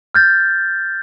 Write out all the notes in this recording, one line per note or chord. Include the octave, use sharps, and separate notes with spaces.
F6 G6 A6